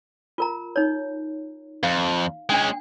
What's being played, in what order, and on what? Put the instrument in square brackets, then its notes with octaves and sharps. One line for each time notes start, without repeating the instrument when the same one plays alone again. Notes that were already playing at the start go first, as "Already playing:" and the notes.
[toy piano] F4 A#4 A#5
D#4 C#5
[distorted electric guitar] F2 [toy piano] F5
[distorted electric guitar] G#3 C#4 [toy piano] D4 G5